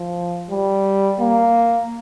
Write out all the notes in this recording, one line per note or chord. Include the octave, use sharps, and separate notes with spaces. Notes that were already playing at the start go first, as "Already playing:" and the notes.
Already playing: F3
G3
A#3